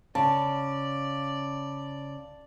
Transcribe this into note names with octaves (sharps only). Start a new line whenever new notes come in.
C#3 D5 A5